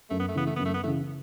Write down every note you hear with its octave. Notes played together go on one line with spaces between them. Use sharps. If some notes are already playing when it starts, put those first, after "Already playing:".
F#2 A3
B3
A3
C#3 E3 B3
A3
F#2 B3
A3
B3
C#3 E3 A3